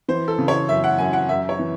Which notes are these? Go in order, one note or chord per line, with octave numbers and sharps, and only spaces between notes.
E3 C5
A4
C#3
C#5
F#2 E5
F#5
F#2 G#5
F#5
F#2 E5
C#5
E3